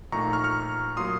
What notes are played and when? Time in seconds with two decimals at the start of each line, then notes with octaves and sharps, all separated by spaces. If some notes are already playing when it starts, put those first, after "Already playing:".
0.12 A#1 A#2 A3 D#4 A#5 C#6
0.33 C#6 F6
0.44 C#6 F6
0.97 A#2 F#3 A#3 F4 C6 D#6